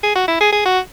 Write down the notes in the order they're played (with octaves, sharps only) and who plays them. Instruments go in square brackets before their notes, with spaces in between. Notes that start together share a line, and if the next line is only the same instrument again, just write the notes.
[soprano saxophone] G#4
F#4
E4
G#4
G#4
F#4